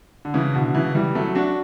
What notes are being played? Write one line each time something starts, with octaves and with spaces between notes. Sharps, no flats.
D3
C#3 E3
B2 D3
C#3 E3
E3 G3
F#3 A3
D4 F#4